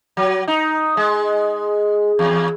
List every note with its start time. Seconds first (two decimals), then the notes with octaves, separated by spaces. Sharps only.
0.17 F#3
0.48 D#4
0.97 G#3
2.19 E2